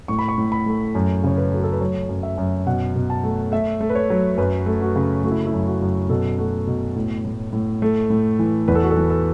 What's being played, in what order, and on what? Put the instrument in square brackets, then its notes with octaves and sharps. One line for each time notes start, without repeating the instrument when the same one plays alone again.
[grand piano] A2 C#6
B5
C#6
A2
B5
A3
F#2
C#3 C#5
B4
A3 F#4
A4
B4
F#3 C#5
F#2
E5
F#2
B2 F#5
B2
A5
A3
A3 E5
A3
B4
C#5
F#3
F#2 B4
A3
F#4
C#3
A3 F#4
E4
E4
F#2
F#4
F#2
B2 A4
A3 F#4
B2
A2
A2
A2
A3
A2
E3
E2 B4
A4
F#4
A4
E3
A4